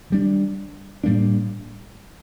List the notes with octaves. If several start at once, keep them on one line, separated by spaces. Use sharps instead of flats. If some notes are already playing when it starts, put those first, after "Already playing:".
D#3 G3 D4
A2 G3 A#3 D4